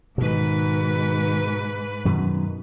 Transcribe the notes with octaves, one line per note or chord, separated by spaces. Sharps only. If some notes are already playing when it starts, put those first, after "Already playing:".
G#2 B2 D#3 B4
F#2 B2 D#3